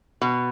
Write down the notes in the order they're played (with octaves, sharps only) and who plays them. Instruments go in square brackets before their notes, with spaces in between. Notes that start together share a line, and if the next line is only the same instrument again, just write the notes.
[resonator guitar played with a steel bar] B2